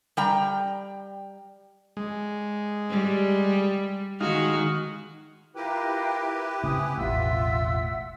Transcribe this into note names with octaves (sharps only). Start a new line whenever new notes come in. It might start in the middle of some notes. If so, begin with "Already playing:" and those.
G3 G5 A#5
G#3
G3
D#3 G#3 D#4 F#4 F5
E4 F4 G4 A#4 B4 G5
C#3 A3 C4 G#5 D#6
E1 A1 A3 F4 E5 F#5 E6